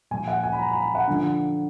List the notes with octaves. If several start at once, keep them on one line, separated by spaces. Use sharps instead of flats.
A#2 F3 G#5
F#5
G#5
B5
A#5
B5
F#5
D3 F3